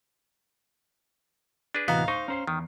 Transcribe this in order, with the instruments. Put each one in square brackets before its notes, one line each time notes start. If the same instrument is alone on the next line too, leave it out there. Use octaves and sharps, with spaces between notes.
[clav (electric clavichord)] D4 G#4 B4
[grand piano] D1 D#5 A#5 [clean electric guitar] C3 E3 F#4 [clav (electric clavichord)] B3 [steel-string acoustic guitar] F5
[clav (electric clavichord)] D#4 [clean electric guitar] C5 [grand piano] C#6
[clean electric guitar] C#4 C5 [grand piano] A#5 C7
[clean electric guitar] E2 [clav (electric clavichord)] D#3